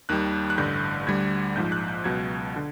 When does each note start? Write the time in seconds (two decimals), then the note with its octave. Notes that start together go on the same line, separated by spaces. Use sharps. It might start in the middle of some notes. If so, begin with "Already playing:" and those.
0.09 D#2 D#3 G3 F#6
0.50 F#6
0.58 A1 G2 D3 G6
1.07 D2 D3 G3 G#6
1.55 A#1 G#2 F3 G6
1.72 F#6
1.88 G6
2.04 C#2 B2 F#3 G#6
2.56 D3